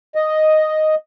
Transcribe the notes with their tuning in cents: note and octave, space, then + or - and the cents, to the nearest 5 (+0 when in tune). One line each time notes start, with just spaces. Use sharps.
D#5 +0